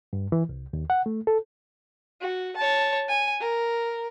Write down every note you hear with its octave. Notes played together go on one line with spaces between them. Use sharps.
G2
E3
C2
D#2
F#5
A3
A4
F#4
C#5 A5
G#5
A#4